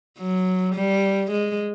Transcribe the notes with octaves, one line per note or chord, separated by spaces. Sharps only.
F#3
G3
G#3